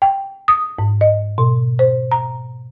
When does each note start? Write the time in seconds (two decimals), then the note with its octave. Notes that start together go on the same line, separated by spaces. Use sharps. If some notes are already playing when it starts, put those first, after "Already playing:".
0.02 G5
0.48 D#6
0.79 G#2
1.01 D#5
1.38 B2
1.79 C5
2.11 A#5